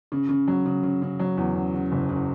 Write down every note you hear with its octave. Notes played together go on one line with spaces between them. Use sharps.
C#3
C#3
F#3
C#3
C#3
C#3
F#3
E2
C#3
C#3
F#1
C#3